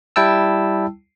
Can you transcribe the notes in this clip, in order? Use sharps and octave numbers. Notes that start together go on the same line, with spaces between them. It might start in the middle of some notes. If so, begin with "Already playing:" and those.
G3 E4 G5 A5 E6